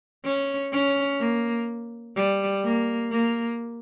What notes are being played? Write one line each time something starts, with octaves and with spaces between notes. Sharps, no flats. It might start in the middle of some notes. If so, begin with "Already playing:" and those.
C#4
C#4
A#3
G3
A#3
A#3